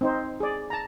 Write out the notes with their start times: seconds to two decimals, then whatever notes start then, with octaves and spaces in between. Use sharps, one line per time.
0.01 C4 D#4 C5
0.40 G#4 D5
0.70 A5 A#5